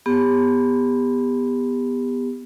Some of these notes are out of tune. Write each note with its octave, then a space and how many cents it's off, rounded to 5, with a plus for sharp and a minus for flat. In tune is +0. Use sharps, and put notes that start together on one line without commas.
B3 +0 G4 +30